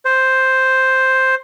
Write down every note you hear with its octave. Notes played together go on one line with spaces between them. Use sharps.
C5